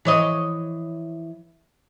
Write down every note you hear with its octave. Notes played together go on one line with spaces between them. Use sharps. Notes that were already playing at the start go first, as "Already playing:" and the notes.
E3 C#5 D#5